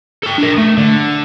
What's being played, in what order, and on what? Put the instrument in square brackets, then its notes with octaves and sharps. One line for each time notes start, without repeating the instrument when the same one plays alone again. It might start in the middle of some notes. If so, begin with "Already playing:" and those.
[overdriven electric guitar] A4 G5
D4 A#4
A3
D3